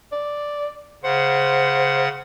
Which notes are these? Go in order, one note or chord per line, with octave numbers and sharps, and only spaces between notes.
D5
C#3 C5 F#5